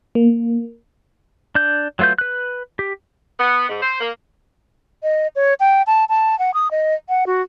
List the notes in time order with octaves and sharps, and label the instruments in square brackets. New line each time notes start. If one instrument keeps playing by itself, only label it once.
[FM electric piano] A#3
[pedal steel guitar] D4 G6
F#3 A3 F4 B4 G6
B4 F#6
G4
[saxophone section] B3
G#2
C5
A#3
[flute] D#5
C#5
G5
A5
A5
F#5
D#6
D#5
F#5
F#4